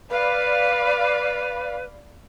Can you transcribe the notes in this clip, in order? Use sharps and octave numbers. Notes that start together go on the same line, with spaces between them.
B4 D5 F5 B5